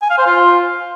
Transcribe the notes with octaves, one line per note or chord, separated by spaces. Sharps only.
G#5
F5
C5
F4